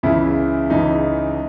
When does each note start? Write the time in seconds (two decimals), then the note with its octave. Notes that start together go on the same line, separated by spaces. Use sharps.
0.03 C#2 C#3 E3 E4
0.70 C#2 C#3 E3 D#4